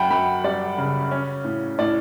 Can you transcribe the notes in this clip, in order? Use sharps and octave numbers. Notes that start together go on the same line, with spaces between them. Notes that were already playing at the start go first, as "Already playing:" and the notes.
Already playing: F#2 F#5 G5 A5 B5
F#2 G5 B5
G3 D5
C#3
C#4
A2
A2 D5